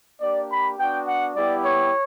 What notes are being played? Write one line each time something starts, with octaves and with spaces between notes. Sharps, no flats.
A#3 D4 G4 D5
B5
B3 D4 F#4 G5
F#5
G3 B3 E4 G4 D5
C#5